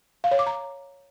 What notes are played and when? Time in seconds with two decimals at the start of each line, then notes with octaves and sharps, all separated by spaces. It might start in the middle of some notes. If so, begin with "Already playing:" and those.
0.24 F5
0.31 C#5
0.39 D6
0.46 A#5